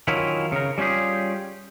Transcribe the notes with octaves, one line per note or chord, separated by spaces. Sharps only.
D#3 F#3 C#4 E4 F4
C#3 A#4
G3 C#4 F4 G4 G#4